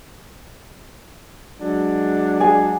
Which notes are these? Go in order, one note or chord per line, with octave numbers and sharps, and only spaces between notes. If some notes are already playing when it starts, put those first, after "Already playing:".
F#3 G#3 D4
G#4 G#5